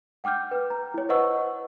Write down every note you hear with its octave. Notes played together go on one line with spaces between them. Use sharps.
F#5 G5 D6 F6 G6
B4
A#5
E4 C#5
B4 C5 D#5 F#5 C#6 E6